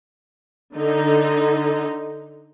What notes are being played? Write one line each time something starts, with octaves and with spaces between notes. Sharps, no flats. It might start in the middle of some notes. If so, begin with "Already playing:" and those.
D3 D#4